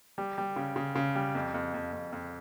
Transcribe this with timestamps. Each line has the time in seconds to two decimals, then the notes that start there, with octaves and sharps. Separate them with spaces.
0.18 G3
0.38 G3
0.56 C#3
0.76 C#3
0.95 C#3
1.15 G3
1.35 F2
1.54 F2
1.74 F2
1.93 F2
2.12 F2